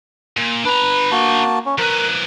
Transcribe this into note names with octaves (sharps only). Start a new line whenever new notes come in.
A#2
D4 B4 A#5
A#3 F#4 A5
C#4
F3 A#4 B4 F#6